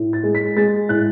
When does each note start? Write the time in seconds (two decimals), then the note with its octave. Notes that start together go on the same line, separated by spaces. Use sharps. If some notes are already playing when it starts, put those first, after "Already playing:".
Already playing: A2
0.13 A6
0.23 G#3
0.35 B6
0.56 G#3 A6
0.89 A2 F#6